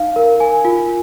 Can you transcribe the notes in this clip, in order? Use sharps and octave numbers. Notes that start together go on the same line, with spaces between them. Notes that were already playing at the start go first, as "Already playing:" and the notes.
Already playing: D#4 F5
A#4
G#5
F4